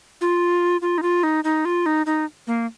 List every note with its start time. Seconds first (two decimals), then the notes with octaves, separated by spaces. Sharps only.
0.21 F4
0.82 F4
0.98 D#4
1.02 F4
1.23 D#4
1.44 D#4
1.65 F4
1.86 D#4
2.06 D#4
2.47 A#3